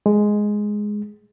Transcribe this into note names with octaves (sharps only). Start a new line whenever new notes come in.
G#3